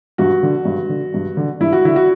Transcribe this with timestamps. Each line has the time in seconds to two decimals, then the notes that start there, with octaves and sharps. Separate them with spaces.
0.18 G2 F#4
0.43 D3
0.65 G2
0.89 D3
1.14 G2
1.37 D3
1.60 G2 E4
1.73 F#4
1.85 D3 E4
1.96 F#4